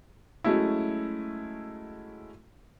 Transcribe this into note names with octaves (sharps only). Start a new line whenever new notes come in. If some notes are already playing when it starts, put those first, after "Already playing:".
F#3 G#3 A3 C#4 E4